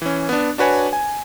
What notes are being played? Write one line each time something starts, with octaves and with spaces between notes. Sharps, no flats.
E3 C#4
B3 D4
D4 F#4 B4 C#5 G#5
G#5